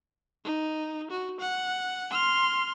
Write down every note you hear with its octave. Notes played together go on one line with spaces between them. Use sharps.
D#4
F#4
F#5
C6 F6